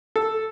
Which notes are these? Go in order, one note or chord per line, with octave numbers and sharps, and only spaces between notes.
A4